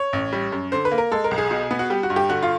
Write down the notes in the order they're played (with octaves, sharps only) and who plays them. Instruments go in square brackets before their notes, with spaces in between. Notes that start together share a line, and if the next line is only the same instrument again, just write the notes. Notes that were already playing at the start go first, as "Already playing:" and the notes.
Already playing: [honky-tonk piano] C#5
A1
G3
F#2
D3 C5
B4
A#3
A#4
G#3 A4
A#4
B1
G#4
B2
B3
F#4
G3 G4
F#4
G2
G4
D3 F#4
F4